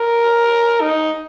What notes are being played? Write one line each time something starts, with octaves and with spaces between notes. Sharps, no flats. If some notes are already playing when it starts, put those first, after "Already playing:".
Already playing: A#4
D#4